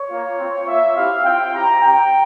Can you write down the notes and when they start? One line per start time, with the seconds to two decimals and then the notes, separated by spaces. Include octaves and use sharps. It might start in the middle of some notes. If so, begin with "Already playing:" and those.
Already playing: C#5
0.10 A#3 F4
0.38 C4 F4
0.67 A#3 F4 E5
0.95 C4 E4 G4 F5
1.24 C4 F4 G5
1.52 C4 E4 G4 A#5
1.81 C4 G4 G5